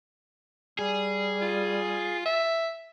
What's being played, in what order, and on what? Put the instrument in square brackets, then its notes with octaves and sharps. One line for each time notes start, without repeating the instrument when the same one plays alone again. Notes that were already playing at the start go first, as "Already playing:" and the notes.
[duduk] G3 [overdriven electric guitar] G#4
[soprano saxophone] F4
E5